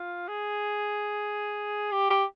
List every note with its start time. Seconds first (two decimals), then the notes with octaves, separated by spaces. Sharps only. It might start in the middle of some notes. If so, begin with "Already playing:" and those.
Already playing: F4
0.28 G#4
1.92 G4
2.10 G4